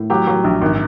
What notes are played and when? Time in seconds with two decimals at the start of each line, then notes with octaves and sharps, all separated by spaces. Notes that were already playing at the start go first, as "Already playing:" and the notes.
Already playing: A2
0.10 F#3 G4
0.27 F#3
0.44 A#1
0.61 G#1